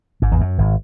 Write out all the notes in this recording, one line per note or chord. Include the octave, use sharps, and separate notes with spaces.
G#1 G#2
E2
F#2
G#1